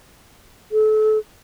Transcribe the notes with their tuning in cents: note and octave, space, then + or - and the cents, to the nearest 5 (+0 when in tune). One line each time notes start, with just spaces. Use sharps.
A4 -30